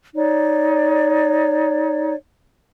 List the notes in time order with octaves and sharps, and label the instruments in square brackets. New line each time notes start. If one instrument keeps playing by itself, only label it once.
[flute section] D#4 C#5 D5